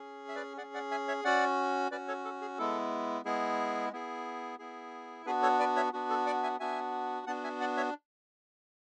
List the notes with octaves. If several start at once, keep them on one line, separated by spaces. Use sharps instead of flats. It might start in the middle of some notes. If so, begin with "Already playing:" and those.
Already playing: C#4 G#4
E5
B4 D5
C#4 G#4 D5 F#5
D5 F#5
E5 G#5
C#5 E5
C#4 F#4 D5 F#5
C#4 F#4 B4 D5
A4 C#5
A4
G#4
G#3 B3 E4 A4
G#3 B3 E4 G#4
B3 E4 G#4
B3 E4 G#4
B3 D4 F#4 G#4 B4
A4 C#5
B4 D5
C#5 E5
B3 D4 F#4
A4
D5 F#5
E5 G#5
B3 D4 F#4 E5 G#5
B3 D4 F#4 F#5 A5
E5 G#5
D5 F#5
C#5 E5